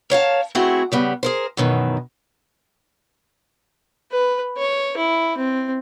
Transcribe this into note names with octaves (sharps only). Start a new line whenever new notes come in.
A#4 C#5 F5 A5
A3 C4 E4 F#4 G#4
C#3 G3 B3
G#4 A#4 C5
F#2 B2 D#3 E3
B4
C#5
E4
C4